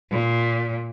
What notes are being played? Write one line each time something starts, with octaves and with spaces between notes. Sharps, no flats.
A#2